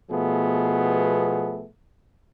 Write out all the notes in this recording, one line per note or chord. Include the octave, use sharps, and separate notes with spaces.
B2 F3 A3 B3 G#4